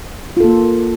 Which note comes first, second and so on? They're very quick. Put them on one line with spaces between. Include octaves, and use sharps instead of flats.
F4 A4 A#3